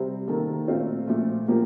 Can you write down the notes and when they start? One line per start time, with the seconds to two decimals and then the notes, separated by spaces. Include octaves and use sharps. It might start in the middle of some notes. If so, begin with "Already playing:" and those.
Already playing: C3 G3 C4
0.28 D#3 A#3 A4
0.68 A#2 A3 C4 F4
1.08 A#2 F3 A3
1.48 A#2 F3 A#3 G4